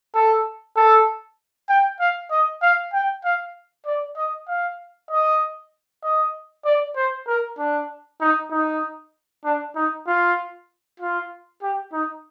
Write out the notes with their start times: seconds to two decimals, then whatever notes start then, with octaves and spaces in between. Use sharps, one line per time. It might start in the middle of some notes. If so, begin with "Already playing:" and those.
0.14 A4
0.76 A4
1.69 G5
2.00 F5
2.31 D#5
2.62 F5
2.93 G5
3.24 F5
3.86 D5
4.17 D#5
4.48 F5
5.10 D#5
6.03 D#5
6.65 D5
6.96 C5
7.27 A#4
7.58 D4
8.21 D#4
8.51 D#4
9.44 D4
9.75 D#4
10.07 F4
11.00 F4
11.62 G4
11.93 D#4